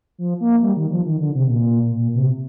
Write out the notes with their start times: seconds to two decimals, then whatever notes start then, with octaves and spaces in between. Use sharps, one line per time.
0.18 F3
0.41 A#3
0.62 G3
0.77 D#3
0.92 F3
1.06 D#3
1.20 D3
1.35 C3
1.49 A#2
1.92 A#2
2.15 C3